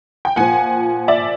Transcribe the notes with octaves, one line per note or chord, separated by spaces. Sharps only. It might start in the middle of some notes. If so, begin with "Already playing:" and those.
G5
A#2 F3 F#5 G#5
D5 E5